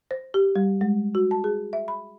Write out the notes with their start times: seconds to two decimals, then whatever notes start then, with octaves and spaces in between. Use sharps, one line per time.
0.11 C5
0.34 G4
0.56 G3
0.81 G#3
1.15 F#4
1.31 A5
1.44 G#4
1.73 E5
1.88 B5